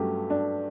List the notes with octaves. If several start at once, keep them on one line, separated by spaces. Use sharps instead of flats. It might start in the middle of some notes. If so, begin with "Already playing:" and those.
Already playing: G2 F#3 A3 C#4 G4
D4